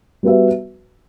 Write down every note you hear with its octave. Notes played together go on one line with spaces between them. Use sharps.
G3 B3 F#4 B4 E5